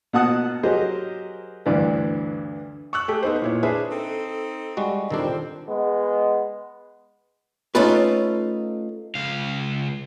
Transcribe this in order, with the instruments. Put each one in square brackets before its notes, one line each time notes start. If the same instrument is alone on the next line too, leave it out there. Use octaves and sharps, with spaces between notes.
[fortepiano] B2 A#3 F#5 A5 D#6 F#6
F#3 G4 G#4 A#4 C5 D#5
D2 G2 E3 D4 B4 D5
[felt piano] C#6 E6 F#6
A3 G4 G#4
B3 D#4 C5
A#2 E4 C#5
D4 G#4 B4 C5 E5
[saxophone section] C4 D#4 A4
[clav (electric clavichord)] G3 G#3 F#4
[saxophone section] F2 C4 [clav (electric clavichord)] D#3 G3 D4
[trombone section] G#3 B3
[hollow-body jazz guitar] A3 C#4 D#4 F4 B4
[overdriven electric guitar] C#2 F5